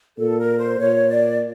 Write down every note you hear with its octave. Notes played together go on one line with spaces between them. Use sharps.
A#2 A4
A#4
C5
A#2 C#5
D5